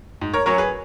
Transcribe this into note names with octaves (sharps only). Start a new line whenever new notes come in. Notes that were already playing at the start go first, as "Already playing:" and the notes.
G#2
A#4 C#5
F#3 C#4 A#4 C#5
G#4 B4